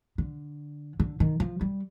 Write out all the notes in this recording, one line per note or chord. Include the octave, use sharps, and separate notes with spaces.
D3
D3
D#3
F3
G3